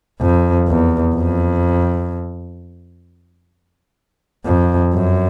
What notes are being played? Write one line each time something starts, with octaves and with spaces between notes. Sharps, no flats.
F2
E2
F2
F2
F#2